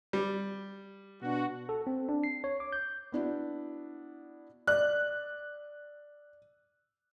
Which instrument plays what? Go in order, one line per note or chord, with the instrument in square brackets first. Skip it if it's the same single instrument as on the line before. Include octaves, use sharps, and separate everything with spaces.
[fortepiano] G3
[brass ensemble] B2 D4 F#4
[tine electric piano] A4
C4
D4
C7
C#5
D6
G6
[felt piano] B3 D4 E4 F#4
[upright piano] D5 [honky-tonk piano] F#6